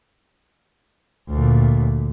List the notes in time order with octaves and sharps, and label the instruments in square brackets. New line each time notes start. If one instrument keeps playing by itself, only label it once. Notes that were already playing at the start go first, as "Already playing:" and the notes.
[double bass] D2 A#2